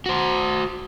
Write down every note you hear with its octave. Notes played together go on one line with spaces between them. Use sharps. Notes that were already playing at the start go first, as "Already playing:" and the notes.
F#4 C5